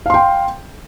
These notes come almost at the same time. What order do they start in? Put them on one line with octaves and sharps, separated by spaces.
F5 C6 G5